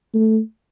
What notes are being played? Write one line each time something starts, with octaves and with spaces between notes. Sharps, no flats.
A3